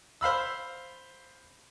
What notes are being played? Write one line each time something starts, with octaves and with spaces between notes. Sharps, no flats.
C5 F5 B5 E6